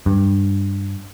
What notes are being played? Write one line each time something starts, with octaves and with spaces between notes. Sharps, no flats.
G2